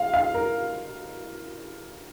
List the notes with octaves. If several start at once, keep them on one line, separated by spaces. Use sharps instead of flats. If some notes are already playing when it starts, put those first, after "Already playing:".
Already playing: F5
F5
A#4